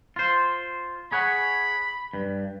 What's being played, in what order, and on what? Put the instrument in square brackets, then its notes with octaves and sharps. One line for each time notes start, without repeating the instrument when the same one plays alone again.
[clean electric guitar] F4 C5
[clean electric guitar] G#4 C#5 F#5 [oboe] B5
[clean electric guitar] G2